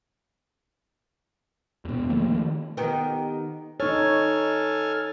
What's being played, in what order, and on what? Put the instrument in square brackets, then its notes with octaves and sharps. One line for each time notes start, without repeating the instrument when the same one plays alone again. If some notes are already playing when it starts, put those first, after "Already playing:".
[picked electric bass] E2 B2
D#3 F3 A3 A#3
[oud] D#3 B3 G4
[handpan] D#4 C#5 [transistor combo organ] A4 G#5 F6